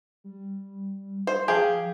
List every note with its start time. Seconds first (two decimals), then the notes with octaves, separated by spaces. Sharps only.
0.24 G3
1.27 C5
1.48 F3 G4 G#4 F5